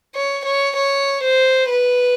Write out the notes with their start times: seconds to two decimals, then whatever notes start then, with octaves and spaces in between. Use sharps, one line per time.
0.15 C#5
0.45 C#5
0.76 C#5
1.24 C5
1.69 B4